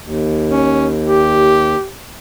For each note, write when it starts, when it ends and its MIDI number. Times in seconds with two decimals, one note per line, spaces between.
0.04 1.76 39
0.49 0.88 61
1.04 1.87 67